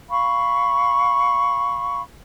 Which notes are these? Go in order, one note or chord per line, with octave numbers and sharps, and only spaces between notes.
F5 B5 C#6